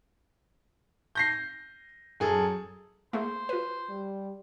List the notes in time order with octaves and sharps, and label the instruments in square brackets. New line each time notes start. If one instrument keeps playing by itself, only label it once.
[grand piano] G6 A#6 C7
F#2 G#4 A4
[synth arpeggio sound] A3 A#3 G#4 [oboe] C5
[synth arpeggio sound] F4 B4
[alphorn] G3